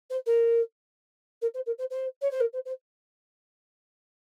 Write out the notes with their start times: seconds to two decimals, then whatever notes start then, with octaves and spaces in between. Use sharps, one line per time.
0.10 C5
0.26 A#4
1.41 A#4
1.54 C5
1.66 A#4
1.78 C5
1.90 C5
2.21 C#5
2.30 C5
2.40 A#4
2.53 C5
2.65 C5